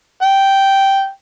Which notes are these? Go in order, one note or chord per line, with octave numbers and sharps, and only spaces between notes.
G5